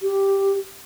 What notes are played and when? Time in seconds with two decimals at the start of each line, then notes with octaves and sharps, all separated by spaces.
0.03 G4